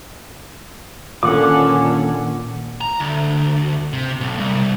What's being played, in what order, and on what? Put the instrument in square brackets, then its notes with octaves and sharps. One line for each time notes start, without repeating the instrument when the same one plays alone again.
[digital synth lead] A#2 [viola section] D3 C#4 A4 [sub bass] D#3 [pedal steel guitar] F#5 D6
[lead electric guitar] A#5
D2
C3
B1
C2